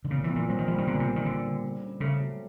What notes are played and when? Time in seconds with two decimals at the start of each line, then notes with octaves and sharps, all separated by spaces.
0.05 D3
0.10 A#2 C#3
0.24 E3
0.30 A#2
0.36 E3
0.49 F#3 C4
0.58 D#3
0.68 F3 G3
0.78 D#3
0.87 A#2 D3
1.00 C3
1.06 A#2
1.16 D#3
1.25 D3 C4
1.44 G3
1.63 D3
1.83 C#4
2.00 C#3 A3
2.20 F#3